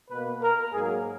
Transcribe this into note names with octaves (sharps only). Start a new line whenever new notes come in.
B2 A#3 B4
A#4
G#2 F#3 A#3 G#4